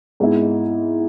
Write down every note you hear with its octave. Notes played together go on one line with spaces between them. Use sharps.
G#2 G#3 B3 E4